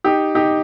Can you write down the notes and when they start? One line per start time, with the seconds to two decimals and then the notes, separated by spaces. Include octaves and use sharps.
0.04 D#4 G4
0.35 D#4 G4